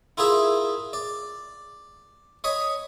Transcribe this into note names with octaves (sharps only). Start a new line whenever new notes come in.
E4 F4 G#4 A#4 E5
D5
C#5 D#5 B5